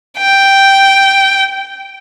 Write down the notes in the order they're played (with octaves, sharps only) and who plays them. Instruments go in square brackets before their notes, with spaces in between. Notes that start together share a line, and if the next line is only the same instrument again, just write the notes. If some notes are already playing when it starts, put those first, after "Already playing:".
[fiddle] G5